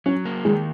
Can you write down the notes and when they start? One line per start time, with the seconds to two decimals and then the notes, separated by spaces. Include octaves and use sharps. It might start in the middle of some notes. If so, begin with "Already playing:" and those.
0.06 F#3 C#4
0.25 A#3
0.45 D#3 G#3